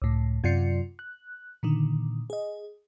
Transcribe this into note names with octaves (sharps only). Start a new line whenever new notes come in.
C#2 A2
F#2 C3 F4 D5 C7 C#7
F#6
A#2 D3 D#3
G#4 D#5